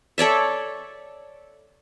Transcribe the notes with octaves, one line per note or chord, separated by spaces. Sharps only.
A4 C#5 D5 E5